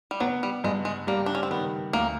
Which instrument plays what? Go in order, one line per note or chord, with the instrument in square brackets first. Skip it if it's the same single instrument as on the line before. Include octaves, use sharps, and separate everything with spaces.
[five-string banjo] G3
[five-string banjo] F#3 [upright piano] B3
[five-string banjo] G3
[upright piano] G2 [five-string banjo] G#3
[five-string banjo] G#3
[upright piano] G3 [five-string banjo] A#3
[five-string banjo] D4
C#4
C4
[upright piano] D#3 [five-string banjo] B3
[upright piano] D2 [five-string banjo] A#3